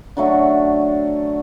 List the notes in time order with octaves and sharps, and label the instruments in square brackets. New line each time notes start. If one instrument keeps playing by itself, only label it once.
[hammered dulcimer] D3 F#3 A3 D4